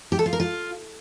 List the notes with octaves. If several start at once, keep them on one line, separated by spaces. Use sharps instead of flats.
G4
A4
F4
A#4
F4